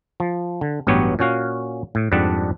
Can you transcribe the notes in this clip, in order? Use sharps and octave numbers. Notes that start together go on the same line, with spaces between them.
F3
D3
A1 G2 F#3 B3 G4 C#5
A#2 C#4 F#4 F5
A2
F2 G#2 G3 D4 F#5 A5